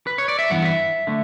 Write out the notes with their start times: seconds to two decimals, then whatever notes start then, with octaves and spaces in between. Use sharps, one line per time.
0.07 B4
0.18 C#5
0.28 D5
0.39 E5
0.50 G2 E3 B3 E4 F#5
0.64 E5
1.07 D3 A3